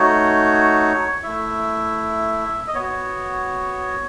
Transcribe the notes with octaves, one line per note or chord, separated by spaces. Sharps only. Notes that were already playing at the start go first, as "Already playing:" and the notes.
Already playing: A3 D#4 F#4 C#5
A3 E4 E5
D#5
B3 F#4 C#5